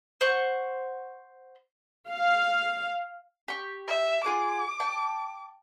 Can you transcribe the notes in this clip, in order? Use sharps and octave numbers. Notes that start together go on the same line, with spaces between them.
C5 F#5 C#6
F5
G4 C#6
E5
F4 G#4 F#5 D6
G5 A5